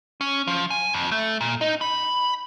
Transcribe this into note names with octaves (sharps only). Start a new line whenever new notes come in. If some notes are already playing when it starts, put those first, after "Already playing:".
C#4
F3
G#5
F2
A3
A#2
D#4
B5